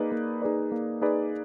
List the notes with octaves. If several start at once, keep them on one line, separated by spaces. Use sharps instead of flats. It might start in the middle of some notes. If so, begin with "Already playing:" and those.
Already playing: A#3 D#4 G#4 B4 D5
A#3
D#4 G#4 B4 D5
A#3
D#4 G#4 B4 D5